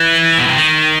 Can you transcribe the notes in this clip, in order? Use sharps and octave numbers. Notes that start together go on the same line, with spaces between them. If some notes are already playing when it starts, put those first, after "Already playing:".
Already playing: E3
B2
C3
D#3